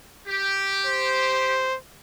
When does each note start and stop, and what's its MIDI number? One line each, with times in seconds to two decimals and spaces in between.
0.27 1.68 67
0.86 1.77 72